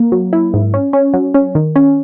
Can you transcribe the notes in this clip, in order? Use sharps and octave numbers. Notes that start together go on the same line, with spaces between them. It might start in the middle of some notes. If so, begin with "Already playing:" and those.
Already playing: A#3
F#3
E4
G#2
C#4
C#4
F#3
C#4
D#3
C#4